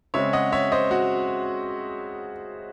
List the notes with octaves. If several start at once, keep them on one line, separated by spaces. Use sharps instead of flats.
C#3 G#3 C4 C#5 E5
D#5 F#5
C#5 E5
C5 D#5
F#4